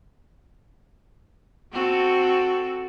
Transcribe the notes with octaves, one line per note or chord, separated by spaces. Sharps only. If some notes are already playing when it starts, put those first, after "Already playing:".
C4 F#4 A4